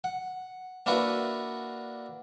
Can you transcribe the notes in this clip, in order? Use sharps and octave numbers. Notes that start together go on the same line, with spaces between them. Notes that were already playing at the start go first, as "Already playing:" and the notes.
F#5
A#3 D4 E4 F#4 B4 F#5